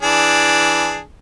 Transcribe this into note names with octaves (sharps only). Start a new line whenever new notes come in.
E3 D4 G#4